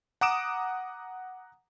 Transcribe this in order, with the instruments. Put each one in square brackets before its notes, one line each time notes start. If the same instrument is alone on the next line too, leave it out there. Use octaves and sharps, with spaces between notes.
[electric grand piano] F#5 A#5 D6 D#6 D7 E7